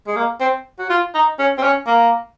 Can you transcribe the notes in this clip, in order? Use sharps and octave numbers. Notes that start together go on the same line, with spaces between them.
G#3
A#3
C4
F#4
F4
D#4
C#4
C4
C#4
A#3